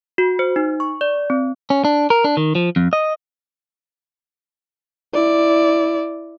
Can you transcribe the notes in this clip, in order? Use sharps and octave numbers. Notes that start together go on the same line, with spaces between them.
F#4
C5
D#4
C#6
D5
C4
C#4
D4
A#4
D4
D#3
F3
F2
D#5
E4 D5